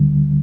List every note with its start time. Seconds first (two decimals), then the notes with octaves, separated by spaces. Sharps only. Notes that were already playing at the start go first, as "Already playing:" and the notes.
Already playing: D2 D3 G3